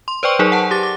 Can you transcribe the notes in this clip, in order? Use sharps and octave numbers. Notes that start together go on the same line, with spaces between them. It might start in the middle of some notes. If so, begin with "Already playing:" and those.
C6
B4 C5 D5 G5 C#6
F#3 D#4 G#4 A#4 D5
F#5 A5
G4 D6 A6
D6